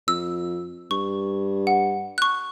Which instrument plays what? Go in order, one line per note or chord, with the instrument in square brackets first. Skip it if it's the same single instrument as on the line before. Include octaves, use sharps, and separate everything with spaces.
[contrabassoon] F2 [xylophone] E6
[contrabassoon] G2 [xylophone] C#6
[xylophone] F#5
C#6 F#6